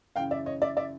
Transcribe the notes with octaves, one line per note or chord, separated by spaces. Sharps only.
F#2 C#3 E3 F5 G5
D5 E5
C#5 D#5
D5 E5
D5 E5